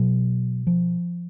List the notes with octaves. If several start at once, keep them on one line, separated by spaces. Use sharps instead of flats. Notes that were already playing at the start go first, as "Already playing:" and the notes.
Already playing: B2 F#3
F3